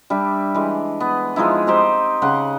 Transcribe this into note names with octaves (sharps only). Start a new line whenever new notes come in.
G3 D4 E5
E3 G#3
B3
F3 G#3 D#4 E4
C4 D#4 G4 C5
C#3 F#5 C6